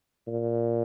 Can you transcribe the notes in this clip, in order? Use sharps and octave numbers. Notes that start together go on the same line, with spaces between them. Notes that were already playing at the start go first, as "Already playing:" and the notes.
A#2